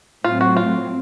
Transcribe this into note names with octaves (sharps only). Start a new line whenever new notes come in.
A2 F#3 C4 F4
F#4
F4